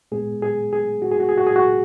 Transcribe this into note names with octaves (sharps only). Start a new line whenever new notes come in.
A#2 G#3 B3 G#4
G#4
G#4
F#4
G#4
F#4
G#4
F#4
G#4
F#4